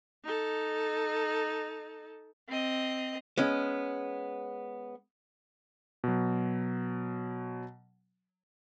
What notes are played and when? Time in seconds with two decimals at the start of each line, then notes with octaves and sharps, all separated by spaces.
0.24 D#4 A4
2.49 C4 D#5
3.37 G#3 B3 C#4
6.04 B2 F#3